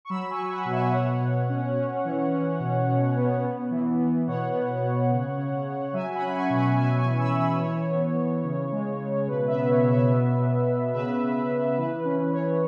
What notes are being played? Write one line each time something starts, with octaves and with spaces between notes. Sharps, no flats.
C#6
F#3 B5 E6
G#5 C#6
F#3
F#5 B5
B2
E5 G#5
B2 C#5 F#5
B2
C#4
C#4
E3
C#4
B2
B2
B3
B3
E3
B3
B2 C#5 F#5
B3
B2
C#3
C#3
C#3
F#3 E5 G#5
F#5 B5
C#4
B5
G#5 C#6
B2
F#5 B5
C#4 E5 G#5
G#5 C#6
E3
B5 E6
E3
B5 E6
E3 C#5
B3
E3
C#3
G#3
C#3
B2 B4
B4 E5
B3
C#5
B2
B4 E5
B3
B2
B3
C#3 B4 E5
B4
C#3
B4
C#3
B4
E3 B4
C#4 B4
E3 C#5